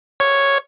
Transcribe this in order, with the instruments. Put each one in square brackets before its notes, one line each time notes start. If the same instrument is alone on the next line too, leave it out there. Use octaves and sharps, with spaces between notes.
[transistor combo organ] C#5